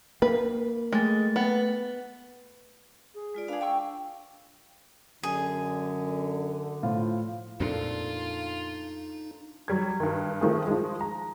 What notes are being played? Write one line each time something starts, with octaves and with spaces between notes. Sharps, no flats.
A#3 B4
G#3 A3 A6
B3
G#4
G#3 F4 D5
D4 G#4 B4 F5
G5 C#6 E6
F#2 D3 G#4
A2 F3 F4
F2 A#2 D4 D#4 F4 A4
F#3 G3 G#6
G2 D#3
D#3 F3 A3 E4 G#4
F3 G#3
A#5